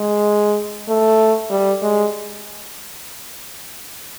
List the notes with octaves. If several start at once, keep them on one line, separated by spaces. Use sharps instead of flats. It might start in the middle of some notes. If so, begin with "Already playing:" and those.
Already playing: G#3
A3
G3
G#3